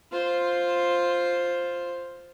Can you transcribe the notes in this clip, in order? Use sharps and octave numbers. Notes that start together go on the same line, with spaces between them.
F4 C5